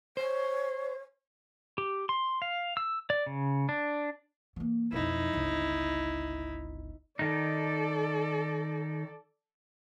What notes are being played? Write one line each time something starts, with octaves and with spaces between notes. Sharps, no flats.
C5 C#5
G4
C6
F5
E6
D5
C#3
D4
E3 A#3
B1 F2 D#4 E4
G1 C#2
D#3 D#4 A4 D5